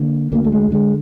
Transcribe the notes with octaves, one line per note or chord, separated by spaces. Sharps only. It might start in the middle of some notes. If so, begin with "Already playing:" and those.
Already playing: D3 A#3
D2 A#3
A3
G#3
D3 G#3